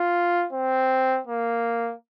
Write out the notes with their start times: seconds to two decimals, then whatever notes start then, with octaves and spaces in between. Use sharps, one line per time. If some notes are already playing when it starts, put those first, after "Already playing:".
Already playing: F4
0.53 C4
1.27 A#3